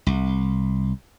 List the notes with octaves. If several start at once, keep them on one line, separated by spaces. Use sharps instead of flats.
C2